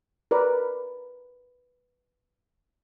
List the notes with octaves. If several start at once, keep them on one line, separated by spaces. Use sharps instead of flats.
A#4 B4 D5